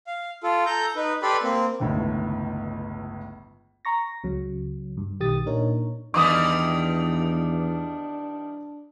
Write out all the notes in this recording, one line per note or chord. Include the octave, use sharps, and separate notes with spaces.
F5
F4 A4
A4 A#5 G6
D#4 B4
G4 A4 B4 D5 B5 C6
A#3 C4
G1 C#2 A2 D3 D#3
A#5 C#6 A#6
C#2 C#3 F#3
G2
B1 D#3 G4 D#6 A6
A#2 D4 D#4 A#4 C#5
E2 D#3 E3 G3 D4 D6 D#6